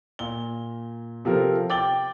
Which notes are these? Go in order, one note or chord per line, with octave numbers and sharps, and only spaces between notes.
A#2 G7
C3 F3 A4 A#4
G5 D6 A6 F#7 G7